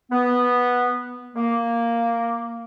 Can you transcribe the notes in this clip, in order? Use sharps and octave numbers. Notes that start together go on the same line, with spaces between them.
B3
A#3